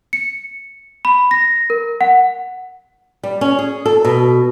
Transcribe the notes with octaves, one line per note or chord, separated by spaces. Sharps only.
C#7
B5
A#6
A#4
F#5
G3
C#4
G#4
A4
B2